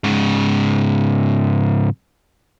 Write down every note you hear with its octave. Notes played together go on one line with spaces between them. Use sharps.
G#2 C#3